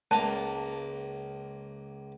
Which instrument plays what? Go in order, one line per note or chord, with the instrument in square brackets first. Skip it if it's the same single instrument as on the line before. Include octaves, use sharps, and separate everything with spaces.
[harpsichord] C#2 A#3 [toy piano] A5